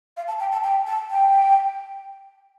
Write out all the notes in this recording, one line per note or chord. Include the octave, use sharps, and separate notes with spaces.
F5
A5
G5
A5
G5
A5
G5